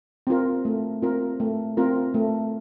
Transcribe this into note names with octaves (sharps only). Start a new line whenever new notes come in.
C4 F4 A#4
A3
C4 F4 A#4
A3
C4 F4 A#4
A3